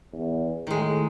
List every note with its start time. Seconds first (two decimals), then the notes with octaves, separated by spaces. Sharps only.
0.12 E2
0.67 A2 D#3 G#3